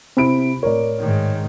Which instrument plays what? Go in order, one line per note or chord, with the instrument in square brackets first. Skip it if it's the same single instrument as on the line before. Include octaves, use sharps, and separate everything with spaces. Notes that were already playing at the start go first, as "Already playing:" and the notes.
[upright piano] C3 B5 D7 [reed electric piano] C4 E4
[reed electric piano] A2 C#5 [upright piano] A#4 D5
[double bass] G#2 D#3